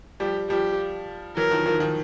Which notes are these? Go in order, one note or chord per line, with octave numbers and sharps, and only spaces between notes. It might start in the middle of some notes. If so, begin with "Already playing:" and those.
F3 G3 G4
F3 G3 G4
E3 F#3 A#4
D#3 F3
D#3 F3
D#3 F3